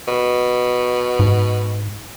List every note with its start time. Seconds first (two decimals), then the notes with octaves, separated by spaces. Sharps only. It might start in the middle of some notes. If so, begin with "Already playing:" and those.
0.08 B2
1.19 G#2